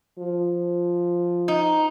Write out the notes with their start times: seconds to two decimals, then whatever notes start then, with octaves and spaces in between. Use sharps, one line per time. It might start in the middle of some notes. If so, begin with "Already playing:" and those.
0.19 F3
1.48 D#4